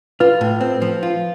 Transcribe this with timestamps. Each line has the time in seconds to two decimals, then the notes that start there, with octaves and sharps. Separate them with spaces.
0.20 F4 B4
0.41 A2
0.61 C4
0.82 F3
1.03 F4